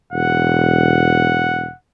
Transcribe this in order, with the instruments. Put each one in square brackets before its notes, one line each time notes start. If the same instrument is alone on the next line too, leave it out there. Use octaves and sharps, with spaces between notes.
[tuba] E1 [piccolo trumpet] F#5